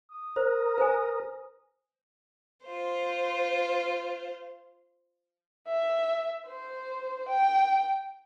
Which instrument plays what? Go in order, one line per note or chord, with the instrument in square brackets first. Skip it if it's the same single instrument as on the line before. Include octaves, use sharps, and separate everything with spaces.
[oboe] D#6
[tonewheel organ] A#4 [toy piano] C5
[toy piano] B4 C5 G#5
[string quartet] F4 C5
[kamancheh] E5
C5
G5